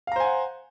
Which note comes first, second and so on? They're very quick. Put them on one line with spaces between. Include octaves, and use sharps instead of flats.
F5 A#5 C5 G#5 F#5